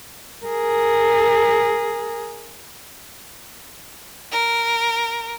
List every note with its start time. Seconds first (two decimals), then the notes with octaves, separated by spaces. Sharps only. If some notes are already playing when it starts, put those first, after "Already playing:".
0.46 G#4 A#4
4.31 A#4